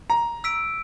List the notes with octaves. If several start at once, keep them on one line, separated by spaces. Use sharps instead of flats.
A#5
E6 B6 D7